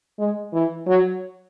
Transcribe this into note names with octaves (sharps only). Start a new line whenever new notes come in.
G#3
E3
F#3